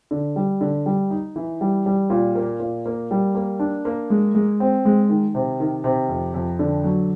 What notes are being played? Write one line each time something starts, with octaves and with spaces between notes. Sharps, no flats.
D3
G3
D3
G3
D#4
E3
G3
G3
A#2
A#3
A#2
A#3
G3
A#3
D4
A#3
G#3
G#3
C4
G#3
D#3
C3
D#3
C3
F2
F2
D3
F#3